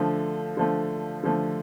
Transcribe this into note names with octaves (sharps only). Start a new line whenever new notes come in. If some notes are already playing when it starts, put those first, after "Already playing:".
Already playing: D3 F3 A3
D3 F3 A3
D3 F3 A3